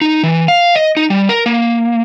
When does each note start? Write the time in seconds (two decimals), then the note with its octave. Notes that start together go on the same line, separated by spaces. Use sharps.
0.01 D#4
0.23 E3
0.48 F5
0.75 D#5
0.97 D#4
1.10 G3
1.29 A#4
1.46 A#3